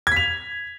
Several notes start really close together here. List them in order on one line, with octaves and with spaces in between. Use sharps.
G#6 B6 F7